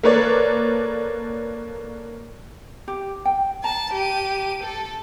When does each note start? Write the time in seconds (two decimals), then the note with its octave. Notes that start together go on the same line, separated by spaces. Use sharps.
0.03 A#3 A4 B4 C#5 D5
2.88 G4
3.25 G5
3.64 A5 A#5
3.93 G4 D#7
4.63 A4